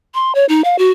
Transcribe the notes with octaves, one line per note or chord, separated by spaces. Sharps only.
C6
C#5
D#4
F5
F#4